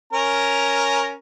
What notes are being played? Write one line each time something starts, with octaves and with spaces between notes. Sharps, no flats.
C#4 A#4 A#5